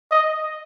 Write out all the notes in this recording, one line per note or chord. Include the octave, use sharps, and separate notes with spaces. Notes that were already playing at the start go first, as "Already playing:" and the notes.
D#5